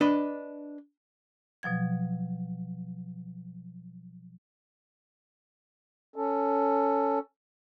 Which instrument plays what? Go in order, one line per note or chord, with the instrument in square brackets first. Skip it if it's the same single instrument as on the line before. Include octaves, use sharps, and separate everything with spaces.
[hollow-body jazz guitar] D4 B4 D#5
[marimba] B2 F3 F#3 G#6
[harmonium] C#4 A4